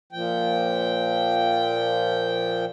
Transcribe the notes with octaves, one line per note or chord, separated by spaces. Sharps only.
A#2 F3 G5